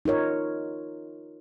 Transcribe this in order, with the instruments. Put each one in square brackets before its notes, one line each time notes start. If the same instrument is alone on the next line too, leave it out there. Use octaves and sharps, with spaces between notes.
[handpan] D#4 F4 A#4 C#5